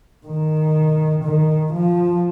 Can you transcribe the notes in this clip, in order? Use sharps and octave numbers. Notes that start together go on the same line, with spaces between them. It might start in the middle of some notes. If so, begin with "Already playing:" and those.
D#3
D#3
F3